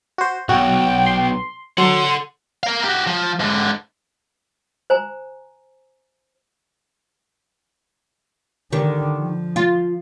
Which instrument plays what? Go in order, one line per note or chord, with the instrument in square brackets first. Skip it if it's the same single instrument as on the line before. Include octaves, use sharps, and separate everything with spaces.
[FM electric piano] F#4 C5
[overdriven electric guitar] B1 [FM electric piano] F#4 [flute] G5
[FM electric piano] C6
[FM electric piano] F#3 [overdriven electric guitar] A4 F#5 [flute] C6
[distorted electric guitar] A#4 F5
F#4 G4
F3
G#2 D3
[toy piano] C5 G#5 A#5
[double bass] D3 [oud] D#3 G4
[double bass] F3
[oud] F4